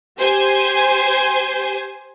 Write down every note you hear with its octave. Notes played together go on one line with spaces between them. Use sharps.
G4 C5 G#5